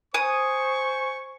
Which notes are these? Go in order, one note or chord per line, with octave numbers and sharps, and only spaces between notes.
C5 G#5 C#6 D#6 G#6